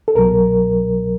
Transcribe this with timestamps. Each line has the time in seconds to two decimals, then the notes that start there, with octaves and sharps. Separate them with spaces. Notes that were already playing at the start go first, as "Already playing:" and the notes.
0.08 A4
0.15 C2 B2 F#3 A#4